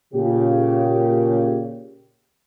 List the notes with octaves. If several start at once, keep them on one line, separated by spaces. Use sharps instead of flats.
A#2 C#3 G4